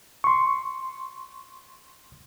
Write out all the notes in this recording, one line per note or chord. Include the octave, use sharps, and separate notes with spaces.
C6 C#6